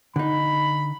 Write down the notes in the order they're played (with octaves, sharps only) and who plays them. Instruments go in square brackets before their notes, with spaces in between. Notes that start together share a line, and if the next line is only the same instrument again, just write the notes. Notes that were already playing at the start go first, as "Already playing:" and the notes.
[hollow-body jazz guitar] D3 D#4 [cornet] B5